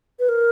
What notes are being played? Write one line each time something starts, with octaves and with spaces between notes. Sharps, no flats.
B4
A#4